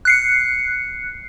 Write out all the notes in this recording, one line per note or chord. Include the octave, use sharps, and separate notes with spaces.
F#6 C7 C#7